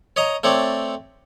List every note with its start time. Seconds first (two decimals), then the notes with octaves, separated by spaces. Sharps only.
0.16 C#5 D#5 A#5
0.44 A3 C4 C#5 D5